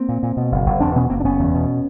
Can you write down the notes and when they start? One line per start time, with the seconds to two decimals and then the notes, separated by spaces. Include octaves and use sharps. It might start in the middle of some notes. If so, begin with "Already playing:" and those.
Already playing: A#3 C4
0.09 A#2
0.23 A#2
0.37 B2
0.52 F#1
0.66 F#1
0.80 E2 C4 D4
0.95 B2 B3 C#4
1.10 F#1 A#3 C4
1.20 D4
1.24 F#1 B3 C#4
1.40 E2
1.54 B2